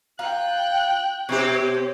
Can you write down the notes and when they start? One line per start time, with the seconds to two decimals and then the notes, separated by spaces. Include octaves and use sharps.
0.19 F4 G5 A#5 F#6
1.29 B2 C4 G4 C#5